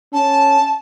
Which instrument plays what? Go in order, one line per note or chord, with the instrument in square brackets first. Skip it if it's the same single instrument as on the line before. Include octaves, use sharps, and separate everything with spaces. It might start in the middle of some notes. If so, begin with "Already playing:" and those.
[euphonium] C#4 [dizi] A5